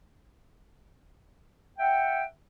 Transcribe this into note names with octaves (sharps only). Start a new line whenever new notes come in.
E5 F#5 G5